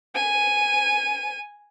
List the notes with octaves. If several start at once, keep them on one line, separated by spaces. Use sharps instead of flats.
G#5 D#7